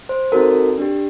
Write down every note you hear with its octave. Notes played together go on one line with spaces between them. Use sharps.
C5
C4 D#4 F#4 A4 A#4
D4 G4